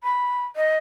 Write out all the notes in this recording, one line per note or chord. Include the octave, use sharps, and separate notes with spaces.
B5
D#5